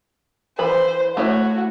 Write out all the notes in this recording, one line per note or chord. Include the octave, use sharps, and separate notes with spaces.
E3 B4 C5 B5
A3 E4 F#4 C#5